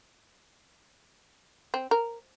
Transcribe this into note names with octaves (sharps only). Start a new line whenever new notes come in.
C4
A#4